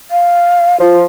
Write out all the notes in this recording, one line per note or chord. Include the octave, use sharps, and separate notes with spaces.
F5
F3 F4